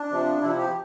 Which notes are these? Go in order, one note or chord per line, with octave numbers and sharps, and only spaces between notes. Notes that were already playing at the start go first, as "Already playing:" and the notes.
Already playing: D4
C3 F3
C3 F3 E4
G4